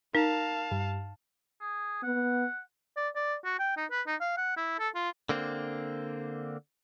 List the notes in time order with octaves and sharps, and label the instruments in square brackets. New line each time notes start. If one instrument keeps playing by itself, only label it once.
[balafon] D#4 [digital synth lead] A#4 [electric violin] F5 A5
[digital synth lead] G2
[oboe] G#4
[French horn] B3 [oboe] F#5
[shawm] D5
D5
F#4
G5
D#4
B4
D#4
F5
F#5
E4
A4
F4
[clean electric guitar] D3 A#3 C4